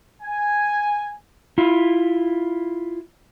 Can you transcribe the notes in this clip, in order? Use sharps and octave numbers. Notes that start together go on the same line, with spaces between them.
G#5
E4 F4